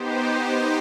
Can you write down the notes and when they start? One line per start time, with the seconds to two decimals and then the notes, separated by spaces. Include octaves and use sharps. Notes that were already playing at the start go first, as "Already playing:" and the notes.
Already playing: B3 D#4 G4 C5